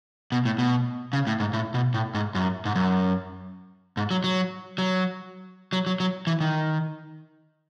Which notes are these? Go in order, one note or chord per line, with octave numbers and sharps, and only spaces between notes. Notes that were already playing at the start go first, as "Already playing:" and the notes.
B2
A2
B2
C#3
A2
G#2
A2
B2
A2
G#2
F#2
G#2
F#2
G#2
F#3
F#3
F#3
F#3
F#3
F#3
E3
D#3